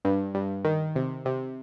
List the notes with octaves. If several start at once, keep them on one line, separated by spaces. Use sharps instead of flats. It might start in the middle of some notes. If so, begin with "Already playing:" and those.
G2
G2
D#3
C3
C3